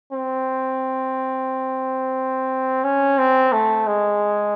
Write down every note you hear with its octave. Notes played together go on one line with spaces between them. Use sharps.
C4
C#4
C4
A3
G#3